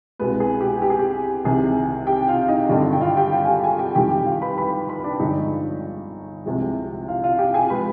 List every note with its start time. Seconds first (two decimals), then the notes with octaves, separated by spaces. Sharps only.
0.19 C2 B2 G#3 B3 B4
0.40 G#4
0.61 G4
0.82 G4
0.90 G#4
0.99 G4
1.44 C2 C3 D#3 G#4
2.07 G4 G5
2.28 F4 F5
2.48 D#4 D#5
2.69 G#1 G2 D3 D4 D5
2.93 G5
3.01 F4 F5
3.17 G4 G5
3.32 F4 F5
3.44 G#5
3.48 G4 G5
3.64 G#4 G#5
3.79 G4 G5
3.95 F2 D#3 G3 G4 G5
4.11 G4 G5
4.26 F4 F5
4.41 B4 B5
4.58 B4 B5
4.89 B4 B5
5.04 D4 D5
5.20 G1 G2 F3 G#3 D#4 D#5
6.45 C2 C3 F3 G#3
7.08 F4 F5
7.24 F4 F5
7.39 G4 G5
7.54 G#4 G#5
7.70 F3 G#3 B4 B5